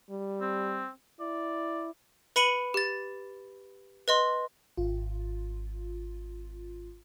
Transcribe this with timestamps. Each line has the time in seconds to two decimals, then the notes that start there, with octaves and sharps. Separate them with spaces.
0.10 G3
0.41 C4
1.20 E4 D5
2.36 B4 B5 C#7 D#7 F#7
2.74 G4 A6
4.08 B4 D#5 C6
4.77 G#1 F4